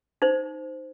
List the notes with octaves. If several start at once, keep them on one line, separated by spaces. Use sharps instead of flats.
D#4 C5